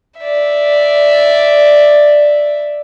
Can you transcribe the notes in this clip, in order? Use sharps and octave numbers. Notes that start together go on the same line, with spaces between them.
D5 E5